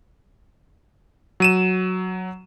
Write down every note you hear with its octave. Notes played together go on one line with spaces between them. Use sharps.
F#3 D#7 E7